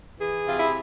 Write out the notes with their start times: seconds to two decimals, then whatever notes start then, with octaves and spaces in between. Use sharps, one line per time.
0.20 E3 G#4
0.46 C3 F4
0.59 E4